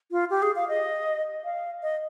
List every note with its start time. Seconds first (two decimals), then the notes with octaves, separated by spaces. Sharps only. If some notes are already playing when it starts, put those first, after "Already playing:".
0.11 F4
0.30 G4
0.42 G#4
0.56 F5
0.68 D#5
1.44 F5
1.83 D#5